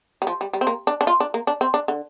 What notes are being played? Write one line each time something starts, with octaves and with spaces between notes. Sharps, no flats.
G3
F3
G3
G3
C4
A#3
D4
D4
F4
D4
A#3
D4
C4
D4
D3